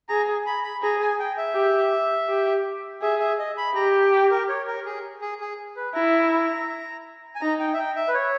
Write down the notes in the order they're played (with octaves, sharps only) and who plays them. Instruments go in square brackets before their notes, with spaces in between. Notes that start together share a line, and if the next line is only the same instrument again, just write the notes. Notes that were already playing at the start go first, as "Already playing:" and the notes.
[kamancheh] G#4 [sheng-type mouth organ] A#5
[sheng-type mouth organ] B5
B5
[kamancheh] G#4 [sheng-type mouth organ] A#5
[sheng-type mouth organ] G#5
G5
E5
[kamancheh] G4
G4
[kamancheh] G#4 [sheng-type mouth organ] E5
[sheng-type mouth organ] E5
D#5
B5
[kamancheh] G4 [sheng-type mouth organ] A#5
[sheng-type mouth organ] G5
A#4
C#5
A#4
G#4
G#4
G#4
B4
[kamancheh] E4 [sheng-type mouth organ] A#5
[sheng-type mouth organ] G#5
[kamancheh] D#4 [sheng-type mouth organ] A#5
[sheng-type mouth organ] G5
E5
G5
E5
B4
C#5